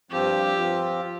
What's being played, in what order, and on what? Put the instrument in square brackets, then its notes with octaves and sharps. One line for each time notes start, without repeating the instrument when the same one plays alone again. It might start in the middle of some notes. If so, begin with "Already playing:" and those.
[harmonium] G2 F3 C4 F4 [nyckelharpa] G4
[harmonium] F3 C4 F4